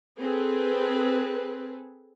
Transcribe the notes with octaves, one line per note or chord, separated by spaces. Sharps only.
C4 G#4 A4 B4